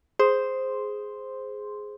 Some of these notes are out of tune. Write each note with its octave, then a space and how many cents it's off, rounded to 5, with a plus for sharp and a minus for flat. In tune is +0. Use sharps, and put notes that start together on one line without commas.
G#4 +5 C5 +0 C6 +0